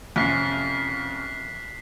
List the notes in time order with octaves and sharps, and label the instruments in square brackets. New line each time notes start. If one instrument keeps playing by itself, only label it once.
[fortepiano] F2 C3 C#4 [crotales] F#6 B6 C7